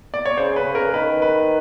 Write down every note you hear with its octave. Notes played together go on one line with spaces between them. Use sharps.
D5
C#5
C#3 C5
B4
C#3
A#4
D#3 B4
B4